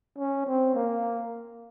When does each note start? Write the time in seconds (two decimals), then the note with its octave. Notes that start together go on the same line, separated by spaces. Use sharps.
0.18 C#4
0.47 C4
0.75 A#3